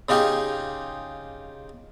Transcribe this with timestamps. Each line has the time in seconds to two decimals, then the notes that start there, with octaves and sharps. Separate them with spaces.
0.09 C#3 D#4 F4 G4 G#4